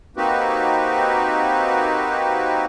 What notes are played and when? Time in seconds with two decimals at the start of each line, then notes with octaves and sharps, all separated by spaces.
0.17 A#3 C4 D#4 F#4 G4 B4